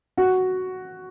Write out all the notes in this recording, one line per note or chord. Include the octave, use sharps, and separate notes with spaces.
F#4